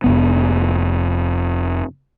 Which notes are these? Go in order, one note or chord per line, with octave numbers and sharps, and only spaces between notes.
F1 F#2 B3